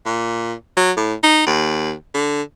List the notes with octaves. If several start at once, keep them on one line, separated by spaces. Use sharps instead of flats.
A#2
F#3
A2
D#4
D#2
D3